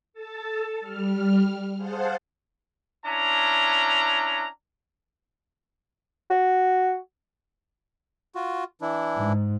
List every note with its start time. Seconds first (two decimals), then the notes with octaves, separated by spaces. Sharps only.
0.14 A4 A5
0.81 G3 F6
1.77 G#4 C5 F5 F#5 A5
3.05 C#4 D4 E4 A#5
6.30 F#4
8.35 F4 F#4
8.81 E3 D4 E4
9.15 G#2